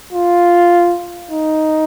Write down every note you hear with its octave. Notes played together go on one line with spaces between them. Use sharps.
F4
D#4